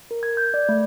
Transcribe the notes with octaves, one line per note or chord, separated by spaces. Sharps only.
A#4
G#6
G6
D5
A3